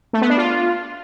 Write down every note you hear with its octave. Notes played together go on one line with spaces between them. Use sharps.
A3
B3
D4
F4